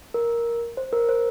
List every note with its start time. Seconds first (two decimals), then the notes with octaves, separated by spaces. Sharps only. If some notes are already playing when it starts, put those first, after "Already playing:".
0.14 A#4
0.77 C5
0.93 A#4
1.09 C5